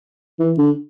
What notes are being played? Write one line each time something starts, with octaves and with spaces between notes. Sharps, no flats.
E3
D3